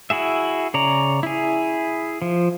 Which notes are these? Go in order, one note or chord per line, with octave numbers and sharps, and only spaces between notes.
E4 F#4 G#4 E5
C#3 C#5 D5 A#5
E4 G#4
F3